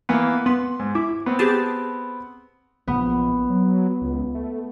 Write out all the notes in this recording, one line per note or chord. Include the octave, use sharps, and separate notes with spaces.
E3 A#3 B3
B3 C6
G#2
E4 D6
B3 C4
G4 G#4 A5
A#1 B3
F#3
C#2
A3